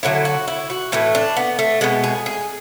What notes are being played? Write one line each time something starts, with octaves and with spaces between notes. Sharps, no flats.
D3 F#3 A3 E4
F#4
E4
F#4
A2 E3 A3 E4
D4
B3
A3
B2 G#3 B3
G#4
G#4